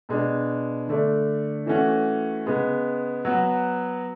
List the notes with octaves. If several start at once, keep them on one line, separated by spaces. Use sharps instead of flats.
B2 G#3 D4
D3 A3 D4
E3 A3 C#4 F#4
C#3 G#3 B3
F#3 B3 F#4